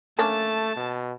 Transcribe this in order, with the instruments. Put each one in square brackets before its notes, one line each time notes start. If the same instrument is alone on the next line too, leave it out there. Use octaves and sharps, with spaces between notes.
[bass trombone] A3 [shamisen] A#3 C#4 D4 [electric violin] A5
[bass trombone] B2